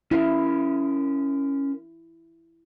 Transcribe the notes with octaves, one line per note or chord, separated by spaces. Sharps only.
C#4 E4 A#4 F5